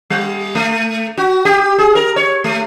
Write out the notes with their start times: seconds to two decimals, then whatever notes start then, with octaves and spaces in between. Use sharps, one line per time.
0.10 G3
0.55 A3
1.17 F#4
1.45 G4
1.78 G#4
1.95 A#4
2.16 C#5
2.44 A3